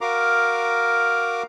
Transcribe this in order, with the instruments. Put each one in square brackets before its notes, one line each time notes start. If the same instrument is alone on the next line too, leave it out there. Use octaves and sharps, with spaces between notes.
[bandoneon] F#4 A#4 F5 A#5 D6